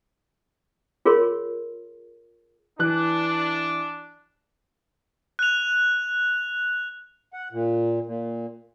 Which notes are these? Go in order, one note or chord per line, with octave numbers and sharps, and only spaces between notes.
F4 G#4 A#4 C#5 C6
E3 D4 F#6
F#6 F7
F#5
A#2
A#2